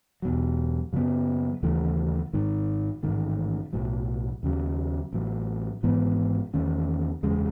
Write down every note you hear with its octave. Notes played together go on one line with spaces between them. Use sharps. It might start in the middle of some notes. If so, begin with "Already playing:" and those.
E2 B2 F#3
F#2 C#3 F#3 B3
D#2 C#3 E3 A3
G#1 G#2 D#3
A1 G#2 D#3 A3
B1 A2 F#3
D#2 C#3 F#3
A1 A2 F#3
G#1 G#2 E3 B3
E2 D#3 A3 C#4
F#1 E2 C#3 G#3